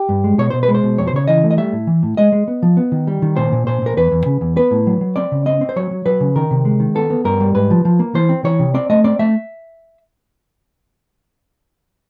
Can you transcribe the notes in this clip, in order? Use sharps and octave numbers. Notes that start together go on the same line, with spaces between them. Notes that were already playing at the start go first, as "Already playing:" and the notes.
Already playing: G4
G2
G#3
B2 C#5
B2 C5
B4
G#3
C5
B2
F2 C#5
C5
C#3 C#5
E3 D#5
A3
D#5
G3 E5
A2
E3
A2
G#3 D#5
G#3
B3
F3
B3
D#3
G3
D#3
A#2 C5
A#2
A#2 C5
A#2 A#4
E2 B4
E2
C#3
E2
B3 B4
A2
F#3
F#3
C4 D5
C#3
C4 D#5
C4
C5
F#3 C#5
F#3
F#3 B4
C#3
D#3 A#4
C3
G#3
D#3
B3 A4
B3
G2 A#4
G3
G#2 B4
F3
F3
A#3
E3 C5
C4
E3 C#5
C3
C4 D5
A3 D#5
C4 D5
A3 E5